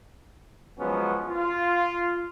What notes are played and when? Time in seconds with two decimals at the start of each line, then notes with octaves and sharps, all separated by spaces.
0.79 F3 F#3 G#3 B3 C#4
1.28 F4